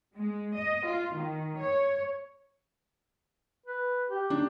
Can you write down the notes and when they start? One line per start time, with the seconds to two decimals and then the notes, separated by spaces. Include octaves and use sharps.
0.14 G#3
0.54 D#5
0.86 F4
1.16 D#3
1.56 C#5
3.66 B4
4.10 G4
4.30 D4